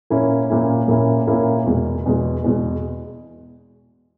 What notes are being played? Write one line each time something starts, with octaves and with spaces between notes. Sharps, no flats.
A#2 A#3 C#4 E4
A#2 A#3 C#4 E4
A#2 A#3 C#4 E4
A#2 A#3 C#4 E4
E2 B2 G#3
E2 B2 G#3
E2 B2 G#3